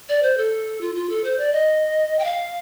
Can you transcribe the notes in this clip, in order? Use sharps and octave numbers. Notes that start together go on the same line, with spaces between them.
D5
C5
A4
F4
F4
A4
C5
D5
D#5
G5
F5